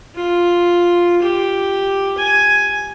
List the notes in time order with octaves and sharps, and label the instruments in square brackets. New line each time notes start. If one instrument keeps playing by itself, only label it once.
[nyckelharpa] F4
G4
G#5